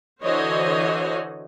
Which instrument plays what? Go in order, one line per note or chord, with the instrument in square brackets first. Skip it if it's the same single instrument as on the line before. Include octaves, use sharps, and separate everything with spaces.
[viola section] D3 E3 F#4 C5 C#5 D#5